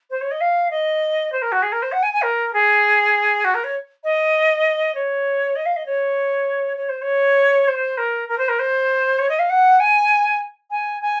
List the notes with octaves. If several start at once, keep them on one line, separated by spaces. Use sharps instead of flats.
C5
C#5
D#5
F5
D#5
C5
A#4
F#4
G#4
A#4
C5
F#5
G#5
G#5
A#4
G#4
F#4
A#4
C#5
D#5
C#5
D#5
F5
D#5
C#5
C#5
C5
C#5
C5
A#4
A#4
C5
A#4
C5
C#5
D#5
F5
F#5
G#5
G#5
G#5